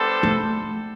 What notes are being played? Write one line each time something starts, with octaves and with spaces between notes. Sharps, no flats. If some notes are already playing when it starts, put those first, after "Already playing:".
Already playing: G3 B3 D4 A4 C5
A3